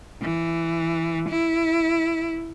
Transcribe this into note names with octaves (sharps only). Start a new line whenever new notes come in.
E3
E4